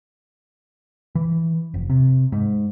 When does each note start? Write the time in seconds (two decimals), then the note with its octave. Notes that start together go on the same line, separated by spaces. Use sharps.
1.15 E3
1.74 F1
1.90 C3
2.32 G#2